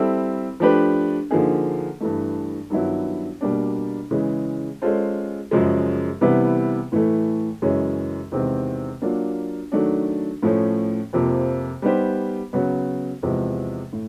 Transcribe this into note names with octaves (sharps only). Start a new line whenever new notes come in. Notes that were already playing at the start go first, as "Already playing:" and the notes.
Already playing: G3 C4 E4 A4
F3 A3 D4 G4 B4
D3 F3 A#3 D#4 G#4
G2 E3 A3
G2 D#3 F#3 B3 E4
B2 G3 A#3 D4
C#3 E3 G#3
G#3 C#4 F4 A4 C5
F#2 C#3 F3 G#3
C3 E3 G3 B3 E4
A2 E3 A3
F#2 C#3 E3 G#3 C#4
E2 C3 D#3 G#3 C4
F#3 A#3 D4 F4
D#3 F#3 A3 D4
A2 F3 A3 C#4
F2 C3 F3 A#3
G3 B3 D#4 G4 C5
C#3 F#3 B3
E2 C3 F3 G#3
A2